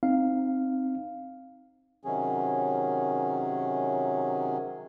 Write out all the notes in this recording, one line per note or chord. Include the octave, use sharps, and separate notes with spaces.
C4 D#4 F5
C3 D#3 F#3 C#4 G#4